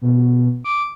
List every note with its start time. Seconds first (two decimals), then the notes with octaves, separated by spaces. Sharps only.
0.02 B2
0.64 D6